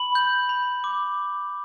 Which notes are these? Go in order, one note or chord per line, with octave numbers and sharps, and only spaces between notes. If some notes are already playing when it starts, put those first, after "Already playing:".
Already playing: B5 F#7
G6
B5
D6